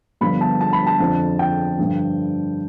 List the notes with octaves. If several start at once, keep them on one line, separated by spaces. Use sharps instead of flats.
G1 G2 D3 F3 B3 B5
A5
A5
B5
A5
F2 D3 F3
G5
G2 D3 F3